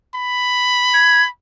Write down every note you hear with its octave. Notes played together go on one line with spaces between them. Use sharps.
B5
G#6